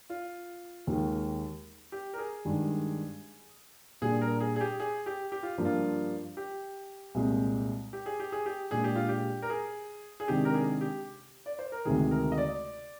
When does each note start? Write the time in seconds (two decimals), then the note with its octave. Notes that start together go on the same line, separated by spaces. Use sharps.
0.10 F4
0.87 D#2 D#3 G#3
1.92 G4
2.13 A#4
2.18 G#4
2.45 G2 D#3 G#3 D4
4.02 A#2 G3 D4 G#4
4.21 A#4
4.40 G#4
4.56 G#4
4.61 G4
4.80 G#4
5.06 G4
5.32 G4
5.43 F4
5.58 G2 F3 A#3 D4
5.65 F4
6.37 G4
7.15 C2 A#2 G#3
7.93 G4
8.06 G#4
8.20 G4
8.32 G#4
8.46 G4
8.71 A#2 G#3 D4 G#4
8.84 G4
8.96 F4
9.09 G4
9.42 A#4
9.50 G#4
10.20 G#4
10.28 C3 D#3 G#3 D4 G4
10.45 A#4
10.54 G#4
10.81 G4
11.46 D5
11.59 C5
11.72 A#4
11.85 D2 C3 D#3 G#3 G#4
12.11 A#4
12.32 D#5
12.38 D5